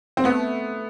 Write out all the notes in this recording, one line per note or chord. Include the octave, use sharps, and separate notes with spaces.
C4
A3 B3